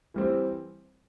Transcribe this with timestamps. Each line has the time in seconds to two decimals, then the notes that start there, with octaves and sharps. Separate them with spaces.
0.14 E3 G3 C4